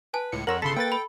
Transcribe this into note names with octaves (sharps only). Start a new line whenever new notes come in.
B4 G#5 A5
C#2 A2 C#7
F2 A#4 C#5 F#5 C6 E6 A#6 F#7
G1 C#3 A4 A5 B5 C6 B6
A#3 B4 G5 E6 A6
B5